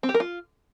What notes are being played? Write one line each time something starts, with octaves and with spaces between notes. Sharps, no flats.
C4
G4
A#4
F4